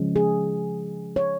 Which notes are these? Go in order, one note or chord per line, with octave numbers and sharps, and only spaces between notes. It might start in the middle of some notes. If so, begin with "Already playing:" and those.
Already playing: C#3 F3 G#3 C#4
G#4
C#5